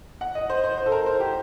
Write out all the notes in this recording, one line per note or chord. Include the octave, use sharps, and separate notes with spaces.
F#5
D#5
C5
C5
C5
A4
A#4
C5
G4